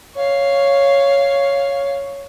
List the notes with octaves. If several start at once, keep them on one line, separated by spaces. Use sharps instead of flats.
C#5 F5